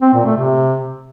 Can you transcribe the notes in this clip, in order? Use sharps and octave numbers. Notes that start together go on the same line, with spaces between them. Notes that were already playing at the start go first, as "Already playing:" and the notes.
C4
A#2
A3
C3